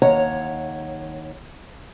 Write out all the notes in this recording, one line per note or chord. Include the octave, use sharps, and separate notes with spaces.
D#2 C#5 F#5 A#5